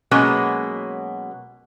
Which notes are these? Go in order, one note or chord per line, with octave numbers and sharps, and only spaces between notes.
B2 F#3 G#3 A#3 B3 C#4